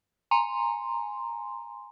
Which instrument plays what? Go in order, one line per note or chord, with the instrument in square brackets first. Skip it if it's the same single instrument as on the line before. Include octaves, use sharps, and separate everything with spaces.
[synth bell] G#5 A#5 C6